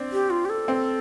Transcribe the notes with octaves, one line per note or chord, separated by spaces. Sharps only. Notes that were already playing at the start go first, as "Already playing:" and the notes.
Already playing: C4 D4
G4
F4
G4
A4
C4